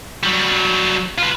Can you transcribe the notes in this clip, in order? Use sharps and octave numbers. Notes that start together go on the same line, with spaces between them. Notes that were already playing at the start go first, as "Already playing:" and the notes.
F#3 G3
F4 B4